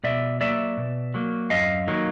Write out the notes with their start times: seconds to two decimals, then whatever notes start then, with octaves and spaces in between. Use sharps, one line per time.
0.04 B2 D5 E5
0.41 F#3 A#3 D5 E5
0.77 B2
1.14 F#3 A#3
1.50 F#2 D#5 F5
1.88 D#3 F#3 A#3